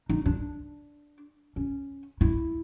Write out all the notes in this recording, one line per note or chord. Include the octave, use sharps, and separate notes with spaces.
D#4
D4
C#4
E4